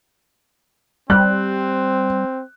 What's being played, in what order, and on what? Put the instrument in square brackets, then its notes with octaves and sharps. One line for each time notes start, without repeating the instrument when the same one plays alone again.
[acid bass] G3 [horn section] C4 [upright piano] F#6